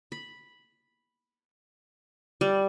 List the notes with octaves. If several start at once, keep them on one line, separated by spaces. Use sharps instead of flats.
B5
G3